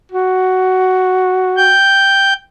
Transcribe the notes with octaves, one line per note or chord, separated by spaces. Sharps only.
F#4
G5 G6